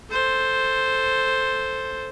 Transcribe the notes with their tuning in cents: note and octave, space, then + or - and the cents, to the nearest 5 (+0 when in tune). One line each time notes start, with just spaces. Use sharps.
A4 +0 C5 +0